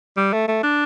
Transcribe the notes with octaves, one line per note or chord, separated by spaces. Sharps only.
G3
A3
A3
D4